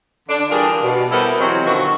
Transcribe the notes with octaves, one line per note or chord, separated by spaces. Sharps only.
D3 D4
E3 G3 D4 F4 G#4 A#4
B2
G3 B3 C4 E4 A4 A#4
C3 E3 F#3 G#3 C4
B2 D3 D#3 F3 F#4